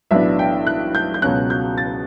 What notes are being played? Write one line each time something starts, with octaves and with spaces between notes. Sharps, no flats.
B1 A2 E3 B3 D4 E5
G5
F#6
G6
G6
C#2 B2 F#3 C#4 F#6
G6
A6